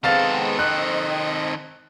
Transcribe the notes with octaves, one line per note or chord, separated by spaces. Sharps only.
D#3 G#3 B3 C4 A4 F5 A6
C4 D#5 F#6